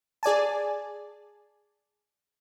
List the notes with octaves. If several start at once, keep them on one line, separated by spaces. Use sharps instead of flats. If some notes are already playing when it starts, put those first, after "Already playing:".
G#4 D5 G#5 A5